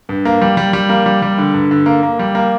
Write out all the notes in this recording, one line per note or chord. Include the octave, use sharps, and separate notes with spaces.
G2
A#3
G3
G3
G3
A#3
G3
G3
D3
G2
D3
A#3
A#3
G3
A#3